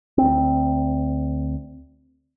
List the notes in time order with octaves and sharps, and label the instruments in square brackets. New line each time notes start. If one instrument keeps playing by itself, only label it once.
[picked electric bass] D2 C4